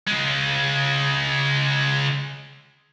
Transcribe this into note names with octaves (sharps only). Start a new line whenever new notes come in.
C#3 G#3